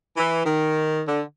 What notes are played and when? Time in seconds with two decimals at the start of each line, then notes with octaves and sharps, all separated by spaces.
0.16 E3
0.46 D#3
1.06 D3